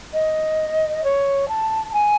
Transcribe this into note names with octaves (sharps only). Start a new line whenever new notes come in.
D#5
C#5
A5
G#5